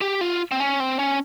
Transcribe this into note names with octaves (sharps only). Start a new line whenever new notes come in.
G4
F4
C4
C#4
C4
C#4